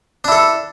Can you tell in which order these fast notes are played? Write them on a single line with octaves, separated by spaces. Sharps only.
D4 E4 A4